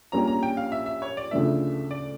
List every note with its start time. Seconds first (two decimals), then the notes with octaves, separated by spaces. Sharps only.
0.12 A#1 A#2 G3 C#4 A#5
0.27 A#5
0.43 G5
0.57 F5
0.72 E5
0.86 E5
1.02 C#5
1.17 D5
1.31 D2 C#3 F3 A3 D4 E5
1.91 D5